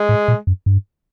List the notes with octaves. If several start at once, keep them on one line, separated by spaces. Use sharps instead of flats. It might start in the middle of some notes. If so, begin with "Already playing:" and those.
Already playing: G#3
A2
A#2
F#2
G2